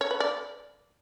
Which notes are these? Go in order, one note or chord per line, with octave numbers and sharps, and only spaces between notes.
C#5
B4
D5